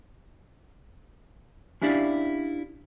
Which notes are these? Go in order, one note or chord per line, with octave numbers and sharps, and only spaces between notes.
C#4 D4 E4 G4 D5 F5